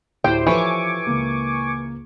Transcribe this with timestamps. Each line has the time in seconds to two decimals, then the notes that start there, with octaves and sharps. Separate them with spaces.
0.24 D2 A2 E4 G4 C5 G5
0.47 E3 F3 A4 B4 C#5 G#5 C#6 D6
1.07 C#2 A#3